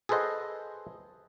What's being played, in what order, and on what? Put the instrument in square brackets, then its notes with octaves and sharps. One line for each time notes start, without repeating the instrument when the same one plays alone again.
[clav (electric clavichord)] G#4 A4 B4 C5 D#5 F#5